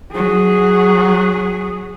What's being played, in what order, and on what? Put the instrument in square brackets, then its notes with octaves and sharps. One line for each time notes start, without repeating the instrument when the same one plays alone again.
[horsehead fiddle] F#3 G#4